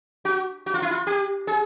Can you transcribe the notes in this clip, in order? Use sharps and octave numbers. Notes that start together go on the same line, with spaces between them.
F#4
F#4
F4
E4
F4
G4
G#4